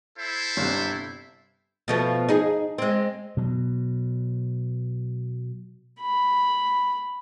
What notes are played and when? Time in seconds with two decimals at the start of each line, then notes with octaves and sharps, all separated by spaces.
0.17 E4 A4 C5
0.57 G1 C3
1.88 B2 F3 A3
2.29 D#4 G#4
2.78 G#3 C4
3.37 B2 F#3
6.01 B5